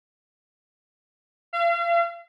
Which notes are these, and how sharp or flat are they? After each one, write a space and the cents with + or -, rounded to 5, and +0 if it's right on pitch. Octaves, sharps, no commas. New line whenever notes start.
F5 -40